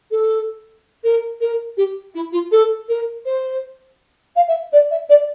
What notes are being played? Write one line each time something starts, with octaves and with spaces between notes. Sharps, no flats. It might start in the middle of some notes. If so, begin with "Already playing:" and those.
A4
A#4
A#4
G4
E4
F4
A4
A#4
C5
F5
E5
D5
E5
D5